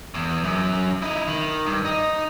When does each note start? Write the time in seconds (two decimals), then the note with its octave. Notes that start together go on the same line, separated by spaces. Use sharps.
0.14 E2
0.44 F#2
1.02 D#4 E4
1.28 D#3
1.66 G2
1.85 D#4